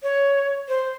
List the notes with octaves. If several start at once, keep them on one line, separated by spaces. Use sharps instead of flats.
C#5
C5